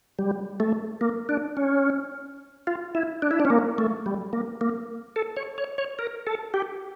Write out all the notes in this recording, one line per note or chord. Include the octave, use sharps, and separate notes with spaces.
G3
A3
A#3
D4
C#4
F4
E4
D4
E4
D4
C#4
A#3
A3
G3
A#3
A#3
A4
C#5
C#5
C#5
A#4
A4
G4